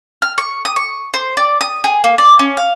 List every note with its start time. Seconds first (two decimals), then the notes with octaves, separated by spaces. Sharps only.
0.22 F6
0.38 C#6
0.65 D#6
0.76 C#6
1.14 C5
1.37 D5
1.61 D#6
1.84 G#4
2.04 A#3
2.18 D5
2.39 C#4
2.57 F5